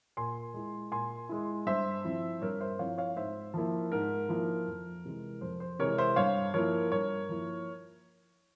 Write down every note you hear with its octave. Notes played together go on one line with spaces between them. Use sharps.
A#2 G#5 C6
G#3 E4
A#2 G#5 C6
G#3 E4
G2 C5 E5
F3 C4 E4
G2 A#4 C#5
C5 E5
F3 C4 E4 C#5 F5
C#5 F5
G#2 C5 E5
F3 A#3 E4
G#2 A#4
F3 A#3 E4
F2
C3 E3 G#3
F2 C5
C5
C3 E3 G#3 A#4 C#5
C5 E5
G2 C#5 F5
F3 A#3 E4 A#4 C#5
G2 A#4 C#5
F3 A#3 E4